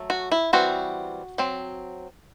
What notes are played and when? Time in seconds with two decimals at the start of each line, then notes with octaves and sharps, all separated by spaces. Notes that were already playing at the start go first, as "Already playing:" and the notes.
Already playing: F#3 A3
0.10 F#4
0.32 E4
0.53 E3 G3 C4 F#4
1.38 F#3 C4